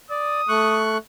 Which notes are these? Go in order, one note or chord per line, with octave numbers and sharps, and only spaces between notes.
D5 D#6
A3 C#6 F#6